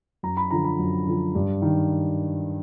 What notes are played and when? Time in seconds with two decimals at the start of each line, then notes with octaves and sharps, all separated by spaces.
0.23 F#2 A#5
0.37 B5
0.51 D3 F3 A#5
0.64 B5
0.79 F#2
1.07 D3 F3
1.35 G2
1.62 D#3